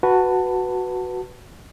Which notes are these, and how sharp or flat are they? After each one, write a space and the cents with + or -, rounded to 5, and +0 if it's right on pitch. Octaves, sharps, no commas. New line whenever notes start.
F#4 +0 B4 +0 A5 +15